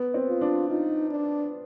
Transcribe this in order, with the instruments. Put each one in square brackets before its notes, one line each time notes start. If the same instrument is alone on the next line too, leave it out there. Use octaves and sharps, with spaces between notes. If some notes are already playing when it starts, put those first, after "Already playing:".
Already playing: [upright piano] B3
C4
[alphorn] F4
[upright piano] D4
[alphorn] D#4 [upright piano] F4
[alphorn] D4